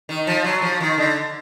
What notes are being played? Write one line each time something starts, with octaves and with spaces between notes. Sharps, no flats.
D#3
F3
F#3
F3
D#3
D3